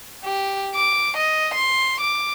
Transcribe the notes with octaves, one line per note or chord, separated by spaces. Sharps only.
G4
D6
D#5
C6
D6